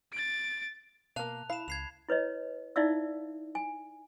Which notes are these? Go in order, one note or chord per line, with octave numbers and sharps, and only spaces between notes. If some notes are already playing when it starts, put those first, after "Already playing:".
A6 D7
B2 A#3 F5 A5 F#6 F7
E4 F5 B5 E7
C#2 G#6 C7 F7
E4 B4 C#5 D#5
D#4 E4 D5 E5 F5 E6
G#5